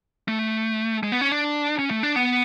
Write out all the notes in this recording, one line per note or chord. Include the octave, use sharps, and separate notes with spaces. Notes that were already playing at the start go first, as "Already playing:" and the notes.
A3
G#3
B3
C#4
D4
C#4
A3
D4
B3